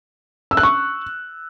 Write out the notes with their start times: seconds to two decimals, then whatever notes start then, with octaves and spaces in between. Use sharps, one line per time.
0.51 E6
0.57 F#6
0.63 C#6